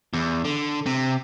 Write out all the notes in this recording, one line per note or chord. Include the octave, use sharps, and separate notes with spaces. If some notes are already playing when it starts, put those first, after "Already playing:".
E2
D3
C3